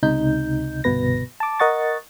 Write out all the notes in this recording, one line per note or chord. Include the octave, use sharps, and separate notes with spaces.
C#2 C3 D#4 G6
G1 C2 B2 B4 A#6
A5 D6
A#4 D#5 F#5 C#6 A6